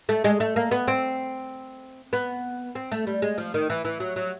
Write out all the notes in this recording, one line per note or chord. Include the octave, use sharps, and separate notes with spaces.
A3
G#3
A3
A#3
B3
C4
B3
C4
A3
G3
G#3
F3
D#3
E3
E3
F#3
F#3